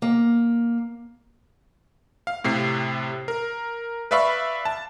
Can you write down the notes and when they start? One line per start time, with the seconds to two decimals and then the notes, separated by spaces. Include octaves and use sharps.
0.02 A#3
2.27 F5
2.44 A2 C3 C7
3.28 A#4
4.11 B4 D5 E5 F5 B5 C#6
4.65 A5